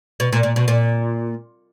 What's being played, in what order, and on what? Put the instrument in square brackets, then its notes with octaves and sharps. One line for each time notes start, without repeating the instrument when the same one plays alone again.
[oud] B2
A#2
A#2
B2
A#2